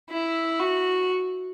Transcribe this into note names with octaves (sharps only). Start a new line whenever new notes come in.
E4
F#4